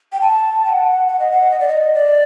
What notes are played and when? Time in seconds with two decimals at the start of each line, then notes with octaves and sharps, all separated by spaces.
0.12 G5
0.21 A5
0.65 G5
0.70 F#5
1.08 F#5
1.19 D#5
1.31 F#5
1.51 D#5
1.60 D5
1.68 D#5
1.94 D5